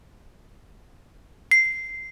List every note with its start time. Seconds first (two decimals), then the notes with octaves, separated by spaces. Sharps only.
1.51 C7